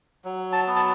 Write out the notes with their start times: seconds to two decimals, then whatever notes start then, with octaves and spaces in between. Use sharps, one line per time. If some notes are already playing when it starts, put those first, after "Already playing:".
0.25 F#3
0.52 A5
0.67 B3
0.76 A5